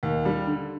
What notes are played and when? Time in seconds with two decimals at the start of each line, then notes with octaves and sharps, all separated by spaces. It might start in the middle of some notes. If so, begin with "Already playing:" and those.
0.03 D#2
0.25 G3
0.47 D3